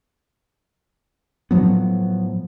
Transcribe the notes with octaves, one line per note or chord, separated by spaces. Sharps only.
A2 F3 F#3 B3